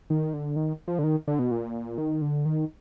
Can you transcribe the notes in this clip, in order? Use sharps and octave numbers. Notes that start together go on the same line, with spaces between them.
D#3
D3
D#3
F3
D3
D#3
D3
B2
A#2
D#3
D3
D#3